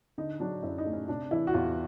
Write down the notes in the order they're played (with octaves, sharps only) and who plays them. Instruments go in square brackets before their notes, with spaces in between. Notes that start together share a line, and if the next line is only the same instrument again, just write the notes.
[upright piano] D3 D#4
F#3 D4
F#2 E4
D#4
A3
C#4
C3 D4
E3 E4
F#4
E2 F4